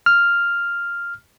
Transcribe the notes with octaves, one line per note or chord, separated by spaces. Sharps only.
F6